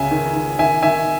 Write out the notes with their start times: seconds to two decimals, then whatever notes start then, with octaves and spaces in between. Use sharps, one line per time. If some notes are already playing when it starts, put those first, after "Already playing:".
Already playing: C#2 C#3 E5 G#5
0.11 D#3
0.35 D#3
0.59 D#3 E5 G#5
0.82 D#3 E5 G#5